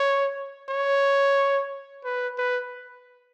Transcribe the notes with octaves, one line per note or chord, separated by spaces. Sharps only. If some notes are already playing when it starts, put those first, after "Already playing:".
Already playing: C#5
C#5
B4
B4